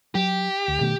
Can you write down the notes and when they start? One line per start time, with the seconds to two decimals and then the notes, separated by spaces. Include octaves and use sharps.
0.15 F#3 G4
0.68 D2
0.81 B2 D#3 A3